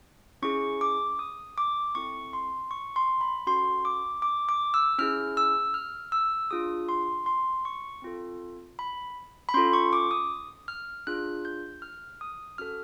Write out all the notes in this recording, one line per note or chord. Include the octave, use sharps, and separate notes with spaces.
C#4 E4 G#4 C#6
D6
D#6
D6
C4 E4 A4 C#6
C6
C#6
C6
B5
C#4 F#4 A4 C6
D6
D6
D6
E6
C#4 E4 G#4 F6
E6
F6
E6
D4 F4 G#4 D#6
C6
C6
C#6
C4 F4 A4
B5
B5
C#4 F4 A4 C6
C#6
D6
D#6
F6
D4 F4 G#4 F#6
G6
F6
D#6
C#4 F#4 A4 F6